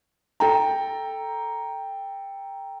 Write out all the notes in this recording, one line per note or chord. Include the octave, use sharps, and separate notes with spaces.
A4 G5 A#5